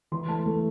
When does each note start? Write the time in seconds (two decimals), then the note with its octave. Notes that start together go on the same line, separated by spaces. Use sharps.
0.12 E3 C6
0.28 A3 A5
0.46 A3